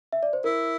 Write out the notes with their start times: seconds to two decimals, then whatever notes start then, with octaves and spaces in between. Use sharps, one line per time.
0.13 E5
0.23 D5
0.33 C5
0.44 E4 A#4